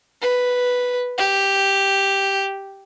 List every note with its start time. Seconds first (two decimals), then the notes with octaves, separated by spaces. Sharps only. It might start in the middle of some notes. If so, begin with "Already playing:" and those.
0.22 B4
1.18 G4